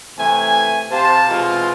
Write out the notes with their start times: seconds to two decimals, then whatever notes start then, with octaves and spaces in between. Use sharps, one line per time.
0.19 C3 E3 A3 G#5
0.91 C3 G4 C5 F5 A5
1.29 B2 E3 G#3 C4 F4